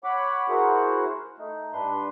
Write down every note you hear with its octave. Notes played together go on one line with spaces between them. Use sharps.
C#5 F#5 B5 D6
E4 F#4 G#4 A#4 C5 F#5
A3 D#4
G2 D4 B4 C6